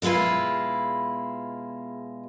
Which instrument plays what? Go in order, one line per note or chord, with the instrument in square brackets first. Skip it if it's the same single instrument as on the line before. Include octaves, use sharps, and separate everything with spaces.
[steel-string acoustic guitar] B2 G#3 E4 F4 B4